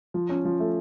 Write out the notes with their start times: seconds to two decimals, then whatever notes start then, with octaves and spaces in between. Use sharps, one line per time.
0.14 F3
0.29 C#4
0.45 F3
0.60 A3